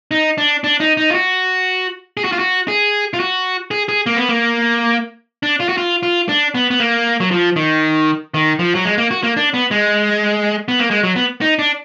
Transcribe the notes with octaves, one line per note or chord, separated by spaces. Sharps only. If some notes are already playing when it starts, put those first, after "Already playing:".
D#4
D4
D4
D#4
D#4
F4
F#4
G#4
F#4
F4
F#4
G#4
F4
F#4
G#4
G#4
A#3
B3
A#3
D4
F4
F#4
F4
F4
D4
B3
B3
A#3
F#3
F3
D#3
D#3
F3
F#3
G#3
A#3
F#4
A#3
D4
B3
G#3
B3
A#3
G#3
F#3
B3
D#4
D4